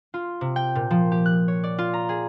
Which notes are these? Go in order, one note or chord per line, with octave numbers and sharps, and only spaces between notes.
F4
C3
G5
A#2
F3
G4
F#6
C#5
D5
F4
A#5
G#4